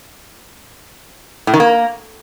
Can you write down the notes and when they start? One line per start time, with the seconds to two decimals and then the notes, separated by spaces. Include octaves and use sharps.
1.47 A2
1.54 D#3
1.60 A#3